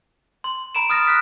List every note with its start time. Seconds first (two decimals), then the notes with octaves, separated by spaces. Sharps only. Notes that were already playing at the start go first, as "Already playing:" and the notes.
0.44 C6
0.75 A#5 B5 D7 E7
0.90 D#6 F6 A6 A#6
1.07 F6 F#6 B6